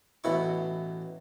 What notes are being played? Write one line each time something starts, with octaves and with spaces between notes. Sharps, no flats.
A1 B2 E4 C#6